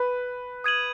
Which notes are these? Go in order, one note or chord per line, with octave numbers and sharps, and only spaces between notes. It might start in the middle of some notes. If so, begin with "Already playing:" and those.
Already playing: B4
D#6 G#6 D#7 F#7